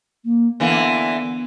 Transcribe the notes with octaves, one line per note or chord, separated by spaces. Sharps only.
A#3
D3 E3 A#3 B3